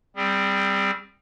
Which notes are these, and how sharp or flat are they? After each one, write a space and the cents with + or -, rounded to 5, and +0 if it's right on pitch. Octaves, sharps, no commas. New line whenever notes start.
G3 +0 C4 +0 G#4 -30